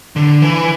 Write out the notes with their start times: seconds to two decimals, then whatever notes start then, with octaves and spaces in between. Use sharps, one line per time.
0.16 D3
0.42 E3